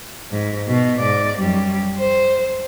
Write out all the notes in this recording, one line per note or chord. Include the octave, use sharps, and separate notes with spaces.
G#2
B2
G#2 D5
F#2 G3
C5